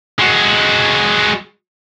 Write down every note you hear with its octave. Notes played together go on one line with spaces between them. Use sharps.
G#3 F#4